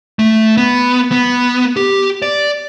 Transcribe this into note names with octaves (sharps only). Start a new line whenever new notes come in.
A3
B3
B3
G4
D5